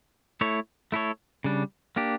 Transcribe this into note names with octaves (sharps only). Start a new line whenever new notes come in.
A3 E4 A4 C#5
A3 E4 A4 C#5
C#3 G3 D4
A#3 D4 G4